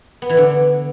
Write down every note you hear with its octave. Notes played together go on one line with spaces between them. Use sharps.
B3
E3
D3